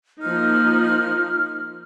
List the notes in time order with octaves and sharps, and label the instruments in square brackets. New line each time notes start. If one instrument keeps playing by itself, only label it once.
[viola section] F3 A#3 D#4 [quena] F6